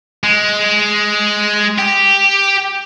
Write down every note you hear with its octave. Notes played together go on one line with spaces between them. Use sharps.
G#3
G4